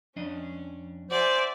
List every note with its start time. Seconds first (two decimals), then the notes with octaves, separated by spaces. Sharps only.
0.16 F2 C#4 D4 D#5
1.11 F#4 C5 D5 E5 G#5